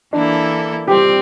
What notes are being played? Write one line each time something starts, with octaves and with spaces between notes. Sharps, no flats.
E3 A#3 D4 E4 A4
G3 C4 G4